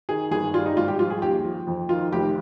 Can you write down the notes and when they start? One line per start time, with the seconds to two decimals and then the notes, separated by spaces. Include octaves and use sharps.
0.09 D#3 G#4
0.31 G1 G#4
0.53 G3 F4
0.66 D#4
0.77 G#1 F4
0.88 G4
0.99 F3 F4
1.10 G#4
1.22 D#2 G4
1.44 F3
1.67 F2
1.89 D#3 F4
2.12 F1 G4